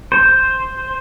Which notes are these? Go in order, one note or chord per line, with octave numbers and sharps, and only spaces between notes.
C5